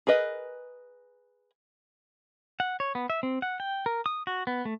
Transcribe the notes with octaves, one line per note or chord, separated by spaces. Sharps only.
G#4 A#4 B4 D#5
F#5
C#5
B3
E5
C4
F#5
G5
A#4
D#6
F#4
B3
A3